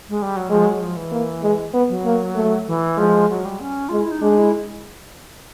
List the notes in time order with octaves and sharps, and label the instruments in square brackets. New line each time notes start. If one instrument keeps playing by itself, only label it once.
[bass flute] G#3
G3
F#3
[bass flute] F3 [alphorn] G#3
[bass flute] F#3
F3
E3
[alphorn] A#3
G#3
B3
[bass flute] F#3
[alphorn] A#3
A3
[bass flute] E3
[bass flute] F3 [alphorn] G#3
[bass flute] F#3
G3
C#4
[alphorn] G#3 [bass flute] F4
[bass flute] E4
D#4
[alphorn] G#3 [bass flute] D4
[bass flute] E4